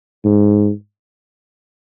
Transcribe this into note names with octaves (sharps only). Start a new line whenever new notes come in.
G#2